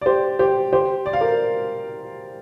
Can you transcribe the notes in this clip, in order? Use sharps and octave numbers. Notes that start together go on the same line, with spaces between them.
D5
G4 C5
G4 C5
G4 C5
D5
F5
A#4 D5